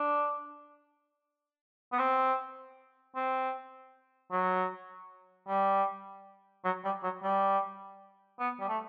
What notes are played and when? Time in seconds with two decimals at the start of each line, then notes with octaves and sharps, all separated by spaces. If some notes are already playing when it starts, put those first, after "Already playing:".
Already playing: D4
1.92 B3
1.99 C4
3.16 C4
4.31 F#3
5.48 G3
6.65 F#3
6.84 G3
7.03 F#3
7.23 G3
8.39 B3
8.60 G3
8.69 A3